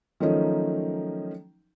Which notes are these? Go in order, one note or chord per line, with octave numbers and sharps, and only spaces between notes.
D#3 F3 F#3 A3 C#4 D#4